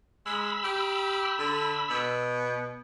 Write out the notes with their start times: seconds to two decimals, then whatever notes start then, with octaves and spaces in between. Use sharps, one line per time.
0.26 G#3 B5 E6
0.64 G4
1.39 D3
1.90 B2